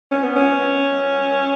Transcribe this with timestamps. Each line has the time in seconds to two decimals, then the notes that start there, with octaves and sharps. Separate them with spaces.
0.11 C#4
0.23 B3
0.36 C#4